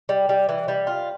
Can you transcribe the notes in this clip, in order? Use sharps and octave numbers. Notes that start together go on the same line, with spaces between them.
G3
G3
E3
G3
F4